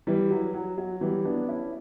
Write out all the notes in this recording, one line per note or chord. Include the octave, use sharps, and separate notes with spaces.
E3 G3
F#3
F#3
F#3
E3 G3
B3 D4
C#4 E4